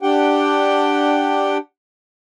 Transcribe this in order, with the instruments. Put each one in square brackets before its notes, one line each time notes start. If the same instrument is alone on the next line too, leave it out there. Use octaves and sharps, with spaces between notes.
[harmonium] D4 G4 F#5 G5